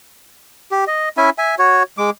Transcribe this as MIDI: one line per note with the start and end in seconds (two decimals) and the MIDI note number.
0.71 0.84 67
0.87 1.09 75
1.17 1.30 61
1.17 1.30 64
1.17 1.30 76
1.17 1.30 80
1.38 1.55 76
1.38 1.55 80
1.59 1.83 66
1.59 1.83 73
1.98 2.10 56
1.98 2.10 86